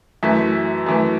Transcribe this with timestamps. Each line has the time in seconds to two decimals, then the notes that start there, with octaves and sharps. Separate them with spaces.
0.23 F#2 E3 A3 E5
0.86 F#2 E3 A3